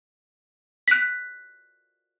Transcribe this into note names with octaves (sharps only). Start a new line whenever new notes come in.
F#6 B6